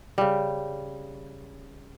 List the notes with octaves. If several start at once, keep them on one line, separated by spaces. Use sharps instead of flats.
C#3 G3